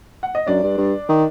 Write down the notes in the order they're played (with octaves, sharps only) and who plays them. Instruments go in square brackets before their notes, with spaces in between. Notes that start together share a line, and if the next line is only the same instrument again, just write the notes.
[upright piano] F#5
D#5
[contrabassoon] F#2 [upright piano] D4 D5
[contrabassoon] G2
G2
D#3